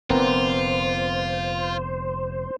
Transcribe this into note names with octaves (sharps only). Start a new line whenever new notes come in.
F1 D3 B3 C4 F4 A#4 C5